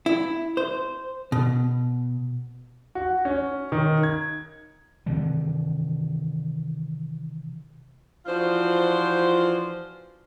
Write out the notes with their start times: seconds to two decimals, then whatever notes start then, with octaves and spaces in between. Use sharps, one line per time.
0.06 E4
0.57 C5
1.32 B2
2.95 F#4
3.25 C#4
3.72 D#3
4.03 G#6
5.06 C3 D#3 E3 G3
8.26 E3 F3 D4 F4 F#4 C5